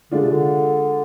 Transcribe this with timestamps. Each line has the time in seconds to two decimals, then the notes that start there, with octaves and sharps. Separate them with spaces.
0.11 D3 G#3 D4 F4
0.22 C3
0.32 D3